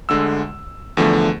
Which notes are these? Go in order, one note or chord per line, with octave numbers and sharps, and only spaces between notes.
D2 D3 G#3 E6
E2 D3 F3 A3